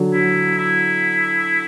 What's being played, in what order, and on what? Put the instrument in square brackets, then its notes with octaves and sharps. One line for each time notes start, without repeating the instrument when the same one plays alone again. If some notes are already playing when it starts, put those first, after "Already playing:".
Already playing: [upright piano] D3 F#3
[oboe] E4
E4